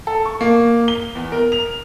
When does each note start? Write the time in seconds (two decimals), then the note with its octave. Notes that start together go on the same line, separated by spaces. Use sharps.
0.07 A4
0.25 C#6
0.41 A#3
0.88 G7
1.15 E2
1.32 A#4
1.52 F7